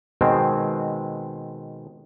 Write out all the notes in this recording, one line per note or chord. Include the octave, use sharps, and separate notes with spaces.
B2 D#3 G#3 C4